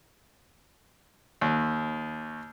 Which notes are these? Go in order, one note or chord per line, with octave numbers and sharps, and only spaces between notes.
D#2